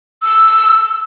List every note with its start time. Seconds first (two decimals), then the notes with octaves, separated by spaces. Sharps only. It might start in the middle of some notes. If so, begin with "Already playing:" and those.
0.24 E6